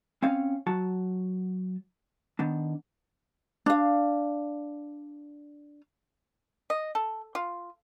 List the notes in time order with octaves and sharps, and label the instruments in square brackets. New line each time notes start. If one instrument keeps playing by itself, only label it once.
[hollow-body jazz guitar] C4 C#4 F5
F#3 F#4 A5
D#3 B3 D4
[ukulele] D4 F5
[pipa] D#5
A4
F4